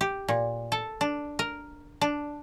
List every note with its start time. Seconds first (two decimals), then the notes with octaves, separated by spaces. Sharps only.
0.01 G4
0.28 A#2
0.72 A4
1.01 D4
1.39 A#4
2.01 D4